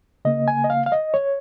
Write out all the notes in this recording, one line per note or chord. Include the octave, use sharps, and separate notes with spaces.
C#3 A#3 D#5
G#5
D#5
F5
F5
D#5
C#5